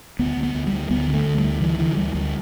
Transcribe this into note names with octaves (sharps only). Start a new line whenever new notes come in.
D2 B3
D2
B3
D2
G3
D2
D2 B3
D3
A3
D2
G3
D2
D3 E3
D3 E3
D2 G3
D2 G3